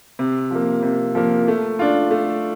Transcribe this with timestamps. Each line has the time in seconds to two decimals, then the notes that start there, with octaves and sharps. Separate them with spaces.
0.19 C3
0.51 F3 A#3
0.83 C3
1.15 F3 A#3
1.48 A3
1.79 D4 F4
2.11 A3